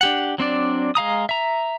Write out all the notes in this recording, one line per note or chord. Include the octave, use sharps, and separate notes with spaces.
D4 G4 F#5
F#3 C4 D4 D5
G#3 F5 A#5 D#6
E5 A#5